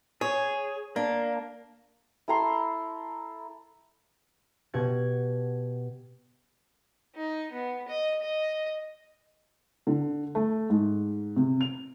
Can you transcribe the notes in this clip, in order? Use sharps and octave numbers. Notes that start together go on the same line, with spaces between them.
G#4 C#5
A#3 D4
E4 A4 A#5 C6
B2 G4 F#5 G#6
D#4
B3
D#5
D#5
D3
A3
G#2
C3
F7